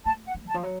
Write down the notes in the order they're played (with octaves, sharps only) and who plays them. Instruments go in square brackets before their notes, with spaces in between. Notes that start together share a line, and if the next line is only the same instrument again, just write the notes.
[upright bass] A3 [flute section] A5
[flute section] F#5
[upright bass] A3
[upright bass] D3 [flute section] A5
[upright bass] F3
F#3